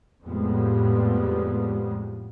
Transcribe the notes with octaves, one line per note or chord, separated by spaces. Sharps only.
F2 A2 F3 G3 G#3 B3